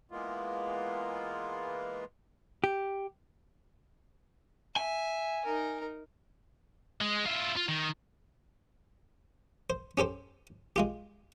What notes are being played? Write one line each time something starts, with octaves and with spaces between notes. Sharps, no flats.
E3 G#3 A#3 B3 F4
G4
E5 G#5
D#4 A#4
G#3
E4 F4
F4
D#3
C5
C#4 G4 A4 C5
G#3 F4 G4